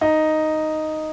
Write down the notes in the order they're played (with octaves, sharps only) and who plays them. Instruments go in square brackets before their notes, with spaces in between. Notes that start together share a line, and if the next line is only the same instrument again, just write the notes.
[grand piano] D#4